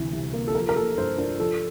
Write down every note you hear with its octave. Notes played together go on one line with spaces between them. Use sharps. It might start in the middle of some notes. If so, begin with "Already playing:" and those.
Already playing: D2 C3 E3
C2
A#3
A4
F3 A#4
A#4
A#3 A4
G2 C5
D4 A#4
F3 A4